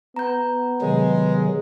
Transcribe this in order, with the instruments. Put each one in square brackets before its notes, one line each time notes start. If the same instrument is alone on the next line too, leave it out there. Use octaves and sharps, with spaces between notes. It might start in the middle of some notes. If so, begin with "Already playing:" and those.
[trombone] B3 [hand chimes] A#5 G6
[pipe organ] C3 D#3 F#3 [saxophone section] G#3